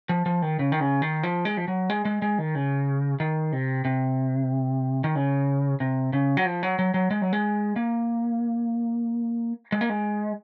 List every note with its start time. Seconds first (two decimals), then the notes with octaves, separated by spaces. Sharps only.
0.09 F3
0.26 F3
0.42 D#3
0.59 C#3
0.72 D#3
0.80 C#3
1.02 D#3
1.23 F3
1.45 G#3
1.57 F3
1.68 F#3
1.90 G#3
2.05 G#3
2.22 G#3
2.39 D#3
2.55 C#3
3.20 D#3
3.52 C3
3.85 C3
5.04 D#3
5.15 C#3
5.80 C3
6.13 C#3
6.37 F#3
6.46 F3
6.63 F#3
6.79 F#3
6.94 F#3
7.11 G#3
7.22 F#3
7.33 G#3
7.76 A#3
9.72 G#3
9.81 A#3
9.89 G#3